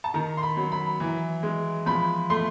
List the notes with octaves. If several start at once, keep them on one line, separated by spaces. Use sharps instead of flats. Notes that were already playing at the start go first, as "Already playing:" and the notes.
A5
D#3 A#5
C6
B5
F#3
B5
E3
G#3
F3 B5
A3 C6